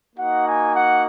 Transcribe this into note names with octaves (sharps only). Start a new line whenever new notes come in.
A#3 D#4 F#4 F#5
G#5
F#5